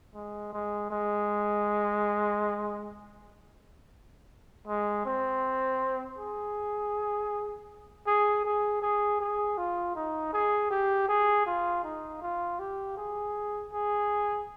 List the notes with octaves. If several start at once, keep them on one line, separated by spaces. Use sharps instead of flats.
G#3
G#3
G#3
G#3
C4
G#4
G#4
G#4
G#4
G#4
F4
D#4
G#4
G4
G#4
F4
D#4
F4
G4
G#4
G#4